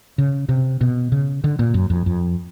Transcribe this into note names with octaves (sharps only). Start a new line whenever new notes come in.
C#3
C3
B2
C#3
D3
A#2
F#2
F2
F2